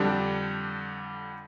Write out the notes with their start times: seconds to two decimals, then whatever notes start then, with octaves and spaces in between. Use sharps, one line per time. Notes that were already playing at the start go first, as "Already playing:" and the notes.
Already playing: F2 D3 G3 D4 G4